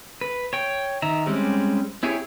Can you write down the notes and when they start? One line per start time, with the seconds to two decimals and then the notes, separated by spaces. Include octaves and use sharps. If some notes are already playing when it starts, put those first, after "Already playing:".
0.21 B4
0.53 C#5 G5
1.02 D#3 E5 A#5
1.26 G3 G#3 C4 C#4 G4
2.03 C4 E4 G4 G#4 C#5